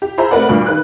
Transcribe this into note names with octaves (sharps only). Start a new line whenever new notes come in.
G4
F4 G#4 C5 E5 A#5 B5
A3 C4 A#4 B4 D5 F#5
D2 G2 A#2
D#3 B4 F#6